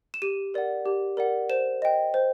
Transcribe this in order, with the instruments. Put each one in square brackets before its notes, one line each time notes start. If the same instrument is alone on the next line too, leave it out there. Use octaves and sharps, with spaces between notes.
[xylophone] E7
G4 D#7
A#4 D5 F#5
G4
A#4 D5 F#5
C5 E7
D#5 G5
C5